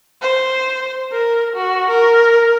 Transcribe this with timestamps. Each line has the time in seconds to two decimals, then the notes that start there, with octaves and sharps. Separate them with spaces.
0.22 C5
1.12 A#4
1.56 F#4
1.89 A#4